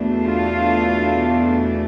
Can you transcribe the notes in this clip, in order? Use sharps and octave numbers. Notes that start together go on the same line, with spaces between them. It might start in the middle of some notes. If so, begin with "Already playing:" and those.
Already playing: E2 B2 A3 D4
F4